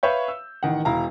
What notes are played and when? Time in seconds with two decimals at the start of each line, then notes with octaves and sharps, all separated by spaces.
0.03 B4 C#5 E5 F5 C#6 G6
0.28 E6
0.63 A1 D#3 F#5
0.85 E1 E4 F5 A#5